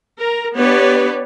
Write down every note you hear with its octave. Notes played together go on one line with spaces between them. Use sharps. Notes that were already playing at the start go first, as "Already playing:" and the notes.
A#4
B3 D4 G4 B4 C#5 D5